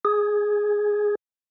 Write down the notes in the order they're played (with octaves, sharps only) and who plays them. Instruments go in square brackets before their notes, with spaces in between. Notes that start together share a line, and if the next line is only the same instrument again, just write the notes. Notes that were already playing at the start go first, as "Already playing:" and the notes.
[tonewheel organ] G#4